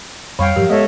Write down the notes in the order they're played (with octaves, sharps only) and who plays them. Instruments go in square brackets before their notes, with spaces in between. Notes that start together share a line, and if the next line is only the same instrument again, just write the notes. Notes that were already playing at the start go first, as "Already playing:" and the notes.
[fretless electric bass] F2 G3 [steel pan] C#5 G5 [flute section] F5 [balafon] B5 C#6
[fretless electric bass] G#2 F3 F#3 [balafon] G4 [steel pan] A#4
[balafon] G#3 [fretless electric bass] B3 [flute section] A4 C#5 E5 [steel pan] D#5